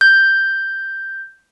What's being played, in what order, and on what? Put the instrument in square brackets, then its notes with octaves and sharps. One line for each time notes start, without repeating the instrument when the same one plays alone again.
[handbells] G6